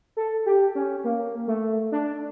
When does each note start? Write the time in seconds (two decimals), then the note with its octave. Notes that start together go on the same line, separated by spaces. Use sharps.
0.17 A4
0.46 G4
0.75 C#4
1.04 A#3
1.47 A3
1.92 D4